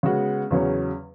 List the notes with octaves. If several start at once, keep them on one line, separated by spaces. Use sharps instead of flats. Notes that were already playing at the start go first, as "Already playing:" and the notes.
C#3 G#3 B3 F#4
E2 C#3 F#3 C#4